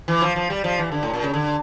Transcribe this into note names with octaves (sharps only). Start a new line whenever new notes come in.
E3
F3
F3
G3
F3
E3
D3
A2
A#2
C#3
D3